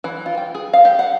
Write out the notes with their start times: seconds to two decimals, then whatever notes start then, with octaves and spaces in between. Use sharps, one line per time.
0.04 E3
0.26 F4
0.38 G5
0.55 G#4
0.73 F5
0.85 G4
0.99 F#5